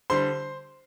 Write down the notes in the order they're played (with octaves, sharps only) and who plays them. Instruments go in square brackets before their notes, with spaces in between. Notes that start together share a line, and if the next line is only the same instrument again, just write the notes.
[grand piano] D3 G3 C5 C6